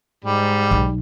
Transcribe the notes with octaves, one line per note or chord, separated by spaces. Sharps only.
G#2 G3
B1